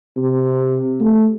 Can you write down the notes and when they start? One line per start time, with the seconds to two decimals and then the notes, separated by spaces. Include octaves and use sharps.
0.17 C3
1.00 A3